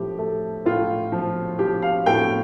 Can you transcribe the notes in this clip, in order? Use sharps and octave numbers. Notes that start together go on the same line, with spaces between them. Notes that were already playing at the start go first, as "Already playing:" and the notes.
Already playing: A2 F3 G4
A3
A2 F4
F3
F3 G4
F5
A2 G5